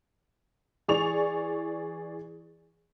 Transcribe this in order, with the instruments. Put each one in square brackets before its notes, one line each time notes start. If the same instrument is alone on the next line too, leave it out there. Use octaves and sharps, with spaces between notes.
[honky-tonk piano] E3 G#4 D5 C#6 F7